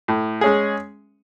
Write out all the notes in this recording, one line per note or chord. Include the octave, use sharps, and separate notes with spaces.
A2
G#3 C#4 G#4